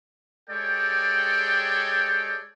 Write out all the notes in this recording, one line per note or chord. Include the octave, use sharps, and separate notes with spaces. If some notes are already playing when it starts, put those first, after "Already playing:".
G#3 G4 A4 C#5 D5 G5